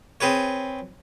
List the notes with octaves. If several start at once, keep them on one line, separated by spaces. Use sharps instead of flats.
C4 G#4 B4 C#5